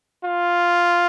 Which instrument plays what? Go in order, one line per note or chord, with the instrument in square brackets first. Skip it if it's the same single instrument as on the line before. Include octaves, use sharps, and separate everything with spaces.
[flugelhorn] F4